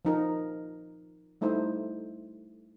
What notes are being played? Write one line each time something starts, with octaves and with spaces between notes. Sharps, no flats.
F3 D#4 A#4
G3 A3 D#4 E4 C5